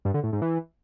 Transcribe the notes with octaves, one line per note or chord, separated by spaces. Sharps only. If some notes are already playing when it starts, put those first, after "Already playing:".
G2
D3
A2
G#2
E3